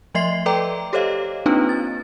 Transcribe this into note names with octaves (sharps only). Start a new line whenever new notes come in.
F3 A3 D#5 E5 C6 C7
A4 B4 D5 G5 A#5 D6
G4 A4 C5 C#5 D#5 F5
A#3 C4 D4 D#4 F4 B4
A6